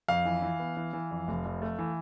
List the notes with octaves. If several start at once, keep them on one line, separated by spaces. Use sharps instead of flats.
F2 F5
E3
E3
B3
E3
E3
F2
F1
F2
A3
E3